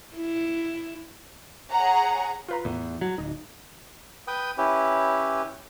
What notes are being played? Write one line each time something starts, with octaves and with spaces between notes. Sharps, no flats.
E4
G#4 C#5 F#5 A#5
F4 B4 A#5
E2 A2
F#3
D1 D#4
B4 G5 D#6
C#4 E4 G4 B4